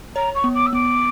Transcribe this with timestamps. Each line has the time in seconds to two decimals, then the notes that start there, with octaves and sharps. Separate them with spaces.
0.15 C#5 A#5
0.35 C#6
0.44 B3
0.54 D6
0.66 E6
0.73 B3 D6